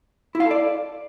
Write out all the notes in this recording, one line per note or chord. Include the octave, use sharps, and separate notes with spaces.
E4
F5
A4
D5